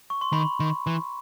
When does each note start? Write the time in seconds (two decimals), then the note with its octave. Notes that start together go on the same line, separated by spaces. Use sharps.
0.10 C#6
0.21 C6
0.33 D#3 B5
0.60 D#3
0.87 E3